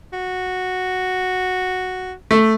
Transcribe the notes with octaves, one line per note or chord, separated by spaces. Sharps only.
F#4
A3